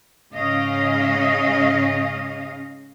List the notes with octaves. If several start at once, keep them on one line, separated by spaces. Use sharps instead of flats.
G#2 C#3 C#4 D#5 F5